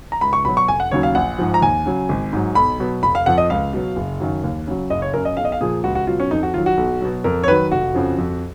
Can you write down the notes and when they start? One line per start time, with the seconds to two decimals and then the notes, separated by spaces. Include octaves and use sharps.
0.12 A#5
0.21 C#2 B5
0.33 C#6
0.45 B2 F#3 B5
0.57 C#6
0.68 F1 G#5
0.80 F#5
0.91 D#2 C#3 F#3 C#5
1.03 F5
1.15 A#1 F#5
1.39 G#2 F3
1.54 A#5
1.62 D#2 G#5
1.86 C#3 F#3
2.09 G#1
2.33 G#2 F#3
2.55 B1 B5
2.80 B2 F#3
3.03 F1 B5
3.15 F5
3.26 F2 F3 F#5
3.38 D#5
3.50 C#2 F5
3.73 B2 F#3
3.96 F#1
4.20 F#2 D#3 F#3
4.44 D#2
4.67 C#3 F#3
4.90 F#1 D#5
5.02 C#5
5.14 F#2 C#3 A#4
5.25 D#5
5.37 B1 F5
5.45 D#5
5.52 F5
5.61 A#2 F3 G#4
5.84 C#2 F#4
5.95 F#4
6.07 B2 F#3 F4
6.20 C#4
6.31 F2 D#4
6.43 F#4
6.54 D#3 F#3 F4
6.66 F#4
6.77 B1
7.01 B2 F#3
7.24 F2 A#4
7.44 C#5
7.48 D#3 F#3 B4
7.72 F1 F#4
7.95 F2 C#3 F3
8.18 F2